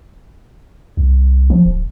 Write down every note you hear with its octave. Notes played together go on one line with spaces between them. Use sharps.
C2
F3
D1